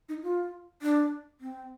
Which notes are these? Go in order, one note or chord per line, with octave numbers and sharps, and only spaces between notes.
D#4
F4
D4
C4